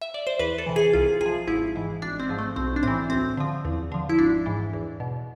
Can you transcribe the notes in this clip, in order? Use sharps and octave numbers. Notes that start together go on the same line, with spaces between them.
E5
D5
C5
E2 B4
A4
C3 E3
G#4
C2 F4
C3 F3 G#4
G#1 E4
G#2 E3
G#1 D4
C4
G#2 F3
A3
B1 C4
D4
A2 E3 C4
D2 C4
D3 F3
E2
D3 F3
E4
G#1 D4
G#2 E3
E2
B2